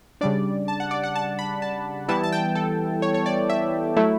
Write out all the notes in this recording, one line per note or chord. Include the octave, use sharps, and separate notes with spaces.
C#3 G3 D4 D5
A5
F#5
D5
F#5
A5
B5
A5
E3 G3 B3 E4 A5
A5
G5
A4
C#5
C#5
D5
E5
F#3 A3 E4